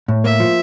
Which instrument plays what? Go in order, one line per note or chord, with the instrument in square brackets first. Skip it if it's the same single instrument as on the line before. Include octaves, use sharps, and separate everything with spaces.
[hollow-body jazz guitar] A2
[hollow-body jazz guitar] A#3 [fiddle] E5
[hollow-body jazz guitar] F3